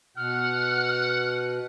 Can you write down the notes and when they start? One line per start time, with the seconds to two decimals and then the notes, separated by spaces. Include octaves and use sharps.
0.17 B2 F#5 F6